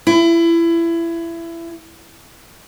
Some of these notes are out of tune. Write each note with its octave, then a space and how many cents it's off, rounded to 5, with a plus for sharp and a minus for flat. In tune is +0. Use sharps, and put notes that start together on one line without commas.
E4 +25